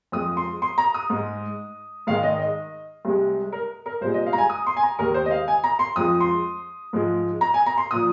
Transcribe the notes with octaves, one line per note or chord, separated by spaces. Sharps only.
F2 F3 G#3 D#6
C6
C6
A#5
D#6
G#2 G#3
G#2 D#3 G#3 F5
D#5
D#5
C2 C3 G#3
A#4
A#4
C2 A#2 G#3 C5
D#5
F5
A#5
G#5
D#6
C6
G#5
A#5
D#2 D#3 G#3 A#4
C5
D#5
F5
G#5
A#5
C6
F2 F3 G#3 D#6
C6
G#2 F3 G#3
A#5
G#5
A#5
C6
A#2 F3 D#6